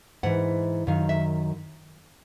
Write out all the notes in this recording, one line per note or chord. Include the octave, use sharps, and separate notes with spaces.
G#2 E3 F#5
F#2 D#3 F5
E5